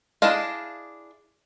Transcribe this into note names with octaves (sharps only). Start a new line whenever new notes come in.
D4 E4 G#4 D#5 F5